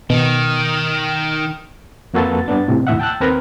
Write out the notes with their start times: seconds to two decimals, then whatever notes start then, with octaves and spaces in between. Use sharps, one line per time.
0.10 B2 D#3
2.13 F2 A#3 F#4 A4 B4 A6
2.46 G2 B3 D4 A6
2.68 A2 C3
2.87 D#2 A2 E5 F#5
3.00 G5 A5 E6 F#6
3.21 D#2 C4 A#4 B4 A#5 B5